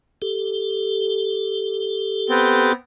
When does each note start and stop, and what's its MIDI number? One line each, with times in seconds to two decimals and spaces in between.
0.22 2.73 67
0.22 2.73 69
2.29 2.72 59
2.29 2.72 60